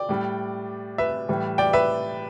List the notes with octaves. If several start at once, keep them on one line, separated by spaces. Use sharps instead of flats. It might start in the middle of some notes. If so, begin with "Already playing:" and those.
Already playing: D5 G5
A2 G3
B4 E5
A2 E3 G3
D5 G5
B4 E5